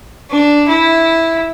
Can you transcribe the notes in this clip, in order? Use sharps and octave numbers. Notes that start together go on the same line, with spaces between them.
D4
E4